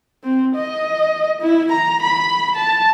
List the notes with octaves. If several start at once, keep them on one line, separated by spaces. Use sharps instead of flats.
C4
D#5
E4
A#5
B5
A5